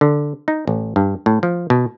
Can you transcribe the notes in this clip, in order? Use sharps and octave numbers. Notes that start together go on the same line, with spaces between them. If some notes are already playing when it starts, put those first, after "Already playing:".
D3
D#4
A1
G2
A2
F3
B2